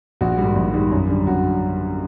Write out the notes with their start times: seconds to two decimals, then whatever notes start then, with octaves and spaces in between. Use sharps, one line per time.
0.21 A#1 F#4
0.37 G#2 D#3 G3
0.56 A#1
0.74 G#2 D#3 G3
0.91 F#2
1.09 D3 G3
1.27 F#2 F#4